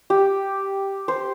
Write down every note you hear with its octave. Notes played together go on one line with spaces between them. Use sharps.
G4
C5